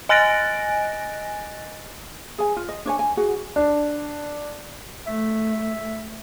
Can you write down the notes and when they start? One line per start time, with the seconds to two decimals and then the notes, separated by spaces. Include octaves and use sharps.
0.09 D#5 G#5 F#6 A6 A#6 D7
2.38 G#4 G#5
2.57 F4
2.69 D#5
2.85 D4 C#5 G#5
2.99 G#5
3.17 F#4 G#4 F#5
3.56 D4
5.07 A3 E5